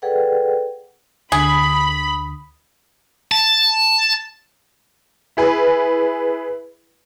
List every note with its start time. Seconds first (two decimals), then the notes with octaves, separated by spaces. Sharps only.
0.02 G#4 A4 B4 D5 F#5 G5
1.32 D2 D3 G#4 B5 D#6
3.32 A5
5.37 E4 G#4 B4